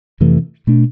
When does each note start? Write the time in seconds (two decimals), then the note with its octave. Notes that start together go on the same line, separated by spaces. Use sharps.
0.20 F2 C3 E3 A3
0.67 B2 A3 D4